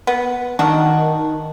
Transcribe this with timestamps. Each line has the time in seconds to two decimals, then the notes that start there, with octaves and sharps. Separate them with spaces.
0.07 B3
0.59 D#3 D4 F#4